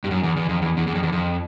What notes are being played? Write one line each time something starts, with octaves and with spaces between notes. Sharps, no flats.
G2
F#2
E2
E2
F2
E2
E2
E2
F2
E2
F2